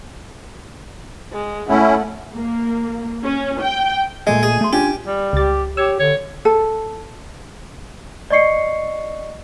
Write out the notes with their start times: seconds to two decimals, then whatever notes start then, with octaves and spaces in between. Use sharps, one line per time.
1.32 G#3
1.69 A3 C#4 E4 F#5
2.35 A#3
3.25 C#4
3.63 G5
4.27 A#2 G#3 A3 D#5 G#5
4.43 G#4
4.61 A3 C6
4.73 C#4 D4 F4 G4 G#5
5.07 G3
5.33 C#2 G4 A6
5.77 G4 C#5 E6
5.99 D3 C#5
6.45 A4
8.30 D5 D#5 C#6 C7 C#7